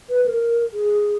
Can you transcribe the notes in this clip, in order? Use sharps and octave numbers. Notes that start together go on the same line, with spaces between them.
B4
A#4
G#4